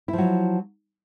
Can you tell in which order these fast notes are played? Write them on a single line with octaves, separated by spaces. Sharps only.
E4 F3 F#3